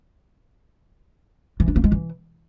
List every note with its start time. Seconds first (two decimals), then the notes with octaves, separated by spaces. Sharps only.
1.60 E3
1.68 D4
1.76 A#3
1.84 G#3
1.92 E3